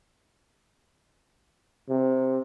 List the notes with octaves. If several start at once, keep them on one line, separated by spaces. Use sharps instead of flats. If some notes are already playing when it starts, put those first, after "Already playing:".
C3